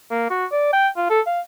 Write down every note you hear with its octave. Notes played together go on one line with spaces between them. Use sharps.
A#3
F#4
D5
G5
F4
A4
F5